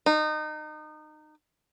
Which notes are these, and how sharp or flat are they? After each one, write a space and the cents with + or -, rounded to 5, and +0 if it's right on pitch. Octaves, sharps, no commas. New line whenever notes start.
D#4 -25